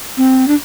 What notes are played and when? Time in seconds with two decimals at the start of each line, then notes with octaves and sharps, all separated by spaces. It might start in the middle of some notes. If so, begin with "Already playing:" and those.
0.17 C4
0.48 D4